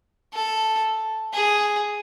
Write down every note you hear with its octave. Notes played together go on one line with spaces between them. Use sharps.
A4
G#4